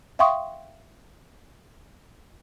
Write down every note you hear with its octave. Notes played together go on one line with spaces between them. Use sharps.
E5 F5 G5 C6 C#6 D#6